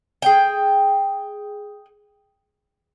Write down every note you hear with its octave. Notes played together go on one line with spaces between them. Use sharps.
G#4 G5